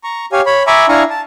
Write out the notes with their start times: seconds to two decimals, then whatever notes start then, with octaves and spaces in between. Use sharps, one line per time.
0.04 A#5 C#6
0.32 G4 C#5 F5 G#5
0.46 C#5 B5
0.67 E5 G#5 A#5 B5 C#6 D6
0.89 D4 E4 F5 G#5 A#5 C#6
1.10 A5